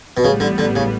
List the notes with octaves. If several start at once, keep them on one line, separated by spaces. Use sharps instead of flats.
B2
A1 A2 C#3 G3 B3
D3
D3
C#3